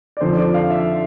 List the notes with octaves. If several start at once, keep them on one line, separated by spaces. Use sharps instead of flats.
D5
F2 D3 F3 C5
D5
F5
E5